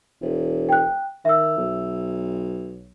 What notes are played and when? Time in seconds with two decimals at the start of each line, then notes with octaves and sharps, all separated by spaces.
0.21 E1
0.69 G5 F#6
1.25 D#3 E5 E6
1.57 B1